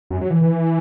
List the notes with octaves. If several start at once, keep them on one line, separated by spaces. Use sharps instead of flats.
F#2
F#3
E3
E3